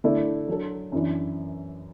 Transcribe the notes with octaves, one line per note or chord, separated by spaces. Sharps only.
D3 A3 E4 D5
F#3 D4 A4
F#2 E3 D4